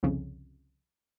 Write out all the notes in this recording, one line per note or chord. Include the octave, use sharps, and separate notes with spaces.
C2 F2 C#3